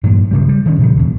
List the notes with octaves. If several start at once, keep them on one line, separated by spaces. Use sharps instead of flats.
G2 A#2 E3 F#3
D#1 C#3 G3
G3
D#3 G3 A#3 C#4
A#2 C#3 F3 F#3
D#2 B2